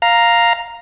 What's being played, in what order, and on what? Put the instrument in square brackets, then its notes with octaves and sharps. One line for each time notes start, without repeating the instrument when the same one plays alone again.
[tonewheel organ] F5 A#5